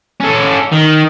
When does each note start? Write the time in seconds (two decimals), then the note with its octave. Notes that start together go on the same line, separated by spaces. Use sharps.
0.21 C#4 A4
0.72 D#3